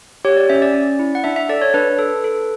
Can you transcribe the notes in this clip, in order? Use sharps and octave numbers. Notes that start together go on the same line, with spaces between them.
G4 C#5
D5
C#4 E5
D5
C#4
E4
F#5
D4 E5
E5
A4 D5
C#5
D4 B4
A4
A4